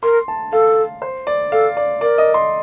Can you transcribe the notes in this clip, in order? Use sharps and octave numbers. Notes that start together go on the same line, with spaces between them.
A#4 C6
A5
A4 F5
C5
D5
A4 F5
D5
A#4 D5
D#5
C6